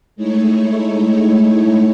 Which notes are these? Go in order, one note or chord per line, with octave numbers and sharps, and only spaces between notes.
G#3 A3 D#4 E4 C#5